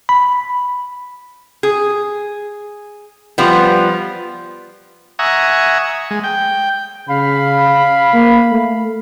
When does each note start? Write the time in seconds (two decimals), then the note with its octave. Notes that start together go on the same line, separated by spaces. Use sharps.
0.09 B5
1.63 G#4
3.38 F3 G3 B3
5.19 E5 F#5 G#5 A#5 C#6 D#6
6.11 G#3
6.24 G5
7.09 C#3 F5 B5
8.13 A#3
8.52 A3